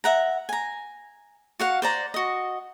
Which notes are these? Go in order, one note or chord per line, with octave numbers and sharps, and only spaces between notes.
E5 F#5 A#5
G#5 A#5
F#4 F5 F#5
C5 D5 A#5
F#4 D#5